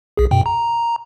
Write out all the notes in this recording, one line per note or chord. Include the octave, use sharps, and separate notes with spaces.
B1 G#4
F#2 B2 G5
A#5